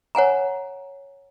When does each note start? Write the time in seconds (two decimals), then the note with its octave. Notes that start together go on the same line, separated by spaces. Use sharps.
0.15 C#5 F#5 G#5 A#5